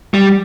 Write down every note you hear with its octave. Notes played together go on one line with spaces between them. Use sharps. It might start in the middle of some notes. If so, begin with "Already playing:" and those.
G3